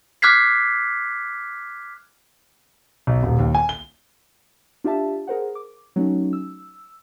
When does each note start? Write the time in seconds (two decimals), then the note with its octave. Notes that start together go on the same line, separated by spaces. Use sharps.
0.22 D6 F6 F#6 G#6 B6 C7
3.07 B1
3.23 D#1
3.39 D#2
3.55 G#5
3.69 G7
4.84 D4 F4 G4 E5 A5
5.27 G#4 A#4 C5 F#5
5.55 D6
5.96 F#3 A3 C#4 D#4
6.33 E6